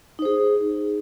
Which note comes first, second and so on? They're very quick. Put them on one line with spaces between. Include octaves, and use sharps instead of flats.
D#4 C5 G#4